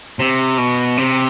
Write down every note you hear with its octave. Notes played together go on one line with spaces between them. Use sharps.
C3
B2
C3